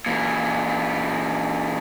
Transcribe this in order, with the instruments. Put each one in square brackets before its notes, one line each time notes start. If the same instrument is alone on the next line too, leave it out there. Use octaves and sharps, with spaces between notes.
[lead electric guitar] A#2 E3